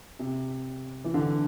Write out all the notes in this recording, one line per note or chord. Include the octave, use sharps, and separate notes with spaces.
C3
E3
D3